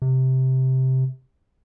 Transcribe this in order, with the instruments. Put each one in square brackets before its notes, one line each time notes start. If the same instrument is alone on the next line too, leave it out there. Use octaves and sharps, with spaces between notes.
[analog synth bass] C3